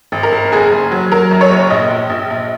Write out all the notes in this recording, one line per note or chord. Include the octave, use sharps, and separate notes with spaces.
G#1
A#4
G#1
F#1 G#4
F#1
F#3
F#3 A#4
F#2
C#5
F#1
A#1 D#5
A#1
A#1
A#1